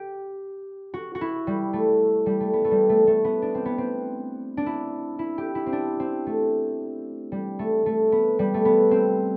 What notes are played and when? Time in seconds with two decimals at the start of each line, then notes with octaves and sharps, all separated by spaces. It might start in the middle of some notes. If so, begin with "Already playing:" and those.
Already playing: G4
0.94 F#4
1.15 F#4
1.21 E4
1.47 G3
1.73 A3
2.26 G3
2.40 A3
2.53 B3
2.64 A3
2.71 G3
2.89 A3
3.07 A3
3.24 B3
3.42 D4
3.55 C4
3.65 B3
3.78 C4
4.57 D4
4.66 E4
5.19 E4
5.38 G4
5.55 E4
5.66 C4
5.73 D4
6.00 C4
6.26 A3
7.32 G3
7.59 A3
7.86 A3
8.12 B3
8.39 G3
8.54 A3
8.65 B3
8.91 C4